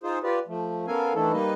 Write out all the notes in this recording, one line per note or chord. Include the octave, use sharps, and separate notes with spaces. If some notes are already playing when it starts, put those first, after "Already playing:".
D#4 F4 G#4 C5
F4 G4 B4 D5
F3 A3
B3 C#4 A4 A#4 F5 G#5
D#3 E3 A3 D4 E4 A4
G3 A#3 D#4 B4 D#5